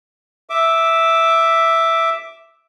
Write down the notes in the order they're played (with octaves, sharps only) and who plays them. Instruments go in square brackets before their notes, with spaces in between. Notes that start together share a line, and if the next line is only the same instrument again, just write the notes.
[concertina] E5 D6